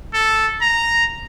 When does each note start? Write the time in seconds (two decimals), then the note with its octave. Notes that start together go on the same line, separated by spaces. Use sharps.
0.14 A4
0.62 A#5